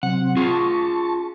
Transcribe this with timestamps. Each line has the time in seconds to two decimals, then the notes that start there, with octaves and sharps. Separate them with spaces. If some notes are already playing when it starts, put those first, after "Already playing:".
0.03 C3 F#3 C4 F#5
0.37 F4 G#4 A5 C#6